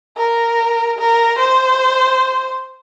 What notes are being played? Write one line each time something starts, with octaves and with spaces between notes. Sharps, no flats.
A#4
A#4
C5